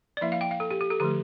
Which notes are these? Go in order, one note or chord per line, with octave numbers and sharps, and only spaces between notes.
D5
F3 A#3 E4 E5
F5
G5
F5
A4
G4
G4
A4
D3 F3 A3 G4